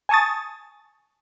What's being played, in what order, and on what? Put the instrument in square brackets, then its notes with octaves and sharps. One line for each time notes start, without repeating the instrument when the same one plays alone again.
[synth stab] G#5 A5 C#6 D#6 A6